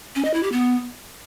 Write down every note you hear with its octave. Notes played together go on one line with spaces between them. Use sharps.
C#4
D#5
E4
G4
B3